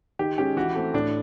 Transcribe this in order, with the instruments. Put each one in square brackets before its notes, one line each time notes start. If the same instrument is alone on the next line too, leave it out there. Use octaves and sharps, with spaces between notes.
[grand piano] D#3 [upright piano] G4
[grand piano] G#3 C#4 [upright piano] G4
[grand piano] E3 [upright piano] F#4
[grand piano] A3 C4
[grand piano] A2 [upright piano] D4